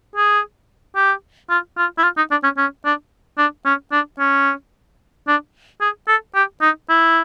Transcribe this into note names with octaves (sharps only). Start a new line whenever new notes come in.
G#4
G4
F4
F4
E4
F4
D#4
D4
C#4
C#4
D4
D4
C#4
D4
C#4
D4
G#4
A4
G4
D#4
E4